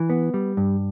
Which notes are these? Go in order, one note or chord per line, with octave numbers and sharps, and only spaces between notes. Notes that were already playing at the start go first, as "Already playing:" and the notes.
Already playing: E3
B3
G3
G2